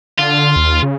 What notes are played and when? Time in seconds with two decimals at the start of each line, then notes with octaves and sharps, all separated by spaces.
0.19 D3 F4
0.56 D#2
0.83 C#3